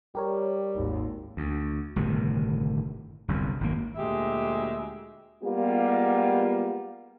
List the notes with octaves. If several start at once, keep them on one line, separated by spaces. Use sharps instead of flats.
G3 G4 A#4 C#5
G#1 D#2
D2
G1 A2 C3 D#3
G1 C2 F#2
G#1 F#2 A#3
D2 A#2 G#3 G4 E5
G3 G#3 A#3 B3 F4 G4